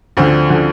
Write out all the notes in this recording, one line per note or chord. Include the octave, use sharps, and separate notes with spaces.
D2 D3 F3 C4
D3 F3